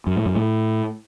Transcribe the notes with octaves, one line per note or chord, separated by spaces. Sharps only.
F#2
A2
F#2
A2